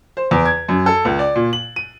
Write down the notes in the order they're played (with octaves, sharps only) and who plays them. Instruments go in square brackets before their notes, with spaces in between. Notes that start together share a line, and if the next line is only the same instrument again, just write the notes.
[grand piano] C5
E2
G#6
F#2
A4
C#2
D5
A#2
F#7
D#7